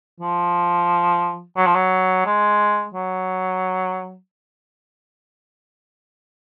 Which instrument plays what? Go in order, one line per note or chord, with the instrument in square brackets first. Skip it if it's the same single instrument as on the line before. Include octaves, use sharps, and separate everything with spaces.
[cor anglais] F3
F#3
F3
F#3
G#3
F#3